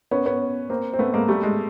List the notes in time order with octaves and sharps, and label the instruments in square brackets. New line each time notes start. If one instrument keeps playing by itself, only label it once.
[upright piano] B3 C#4
B3 C#4
A#3 C4
C4
A3 B3
G#3 A#3
G3 A3
G#3